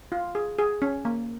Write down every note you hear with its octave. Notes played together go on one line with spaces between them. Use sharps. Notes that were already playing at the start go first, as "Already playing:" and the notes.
F4
G#4
G#4
C#4
A#3